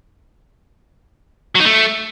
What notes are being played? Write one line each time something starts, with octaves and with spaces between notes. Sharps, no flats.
F#3
D#4
A3